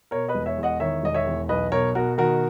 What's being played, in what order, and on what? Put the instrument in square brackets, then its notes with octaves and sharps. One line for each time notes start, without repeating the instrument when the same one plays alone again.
[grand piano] B2 A#4 C#5
B4 D#5
E1
C#5 E5
E2
D#5 F#5
D#3 C#5 E5
E1 D#5
C#5 E5
E2
B1 B4 D#5
B2 A#4 C#5
B2 F#4 A#4
D#3 F#4 A#4